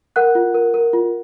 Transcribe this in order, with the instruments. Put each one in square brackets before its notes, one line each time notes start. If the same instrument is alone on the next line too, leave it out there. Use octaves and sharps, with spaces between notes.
[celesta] A#4 F#5 F#6
F4
A#4
A#4
F4